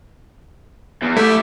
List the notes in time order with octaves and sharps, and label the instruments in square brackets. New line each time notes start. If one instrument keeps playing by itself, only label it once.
[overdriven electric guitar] E2
[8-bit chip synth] A3 [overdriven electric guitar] E4 G4